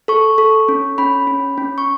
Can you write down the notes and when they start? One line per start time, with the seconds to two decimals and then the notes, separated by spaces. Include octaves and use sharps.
0.08 A4 C#6
0.38 A4
0.68 C#4
0.98 C#4 B5
1.27 C#4
1.58 C#4
1.78 C#6